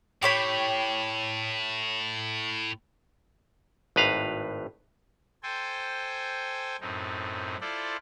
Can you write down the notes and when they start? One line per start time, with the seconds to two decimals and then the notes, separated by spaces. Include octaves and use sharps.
0.22 A2 G4 C#5 B5
3.96 G#1 A2 B4 F5 A#5
5.43 A4 C5 G5 G#5
6.81 F#2 A2 C4 D#4
7.61 E4 F4 A4 C5 D5